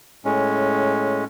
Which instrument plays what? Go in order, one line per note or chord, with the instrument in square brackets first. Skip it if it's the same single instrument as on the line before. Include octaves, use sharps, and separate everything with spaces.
[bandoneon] A2 G#3 C#4